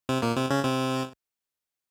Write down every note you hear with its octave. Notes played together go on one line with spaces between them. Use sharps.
C3 C4
A#2 A#3
C3 C4
C#3 C#4
C3 C4